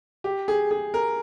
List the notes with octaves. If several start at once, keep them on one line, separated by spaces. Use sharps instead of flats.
G4
G#4
G#4
A#4